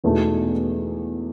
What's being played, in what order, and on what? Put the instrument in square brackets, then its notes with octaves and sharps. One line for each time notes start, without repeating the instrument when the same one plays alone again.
[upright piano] E1 E2 B2 A3 D#4